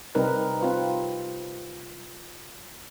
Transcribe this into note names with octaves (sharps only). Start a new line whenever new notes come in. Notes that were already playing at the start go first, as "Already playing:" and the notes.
C3 G3 C4 D#4 A#4 B4
C4 F4 B4